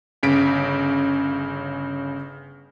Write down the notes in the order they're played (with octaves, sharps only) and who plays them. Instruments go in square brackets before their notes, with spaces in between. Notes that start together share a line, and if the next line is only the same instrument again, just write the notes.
[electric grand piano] G1 C#3 B6 D7